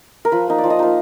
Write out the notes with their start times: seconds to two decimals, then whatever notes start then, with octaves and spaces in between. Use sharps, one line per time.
0.25 A#4
0.32 F3 B4
0.48 A#3 D#4
0.58 D5
0.64 F3
0.70 D#5
0.79 A#3 D#4 F5